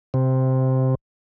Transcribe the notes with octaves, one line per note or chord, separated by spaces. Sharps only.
C3